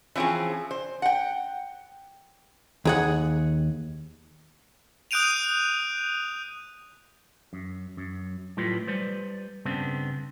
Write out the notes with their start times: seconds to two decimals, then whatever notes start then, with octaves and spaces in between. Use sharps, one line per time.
0.15 E3 F3 C4 C#4 G#4
0.71 C5
1.02 F#5 G5
2.85 D#2 G#4 F#5
5.11 D#6 F#6 G6 D7 D#7 F7
7.53 F#2
7.97 F#2
8.57 A2 F#3 G3 F4 B4
8.87 G3 B4 C5 D5
9.65 G2 C#3 B3 C4 D4